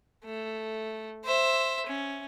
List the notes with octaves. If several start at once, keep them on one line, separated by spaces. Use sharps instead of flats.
A3
C5 E5
C#4